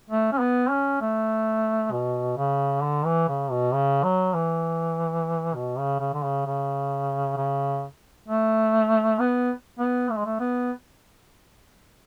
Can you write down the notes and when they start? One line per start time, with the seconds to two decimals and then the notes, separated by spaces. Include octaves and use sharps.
0.10 A3
0.32 C#4
0.40 B3
0.70 C#4
1.01 A3
1.92 B2
2.37 C#3
2.82 D3
3.05 E3
3.29 C#3
3.51 B2
3.74 C#3
4.04 F#3
4.33 E3
5.55 B2
5.78 C#3
6.00 C#3
6.13 D3
6.23 C#3
6.46 C#3
7.37 C#3
8.28 A3
9.19 B3
9.79 B3
10.10 A3
10.18 G#3
10.26 A3
10.40 B3